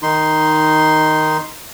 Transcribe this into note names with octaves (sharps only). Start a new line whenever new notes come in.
D#3 D#4 C6